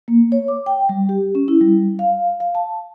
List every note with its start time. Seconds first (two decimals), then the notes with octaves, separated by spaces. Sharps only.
0.08 A#3
0.32 C#5
0.48 D6
0.66 G5
0.89 G3
1.09 G4
1.35 C#4
1.48 E4
1.61 G3
1.99 F5
2.40 F5
2.55 A5